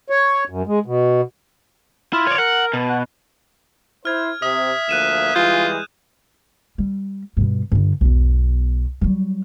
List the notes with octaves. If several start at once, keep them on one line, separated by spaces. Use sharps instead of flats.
C#5
F#2
G#3
B2
E4 F4
C#5 D5
A#4 F#5
B2
F#5
E4 C5 F6 G#6
C3 E5 D#6
D2 F3 A#3 F#6 D#7 E7
E3 G3 G#3 F4 G6
G3
G2 B2
G2 D3
B1 E2
F#3 G3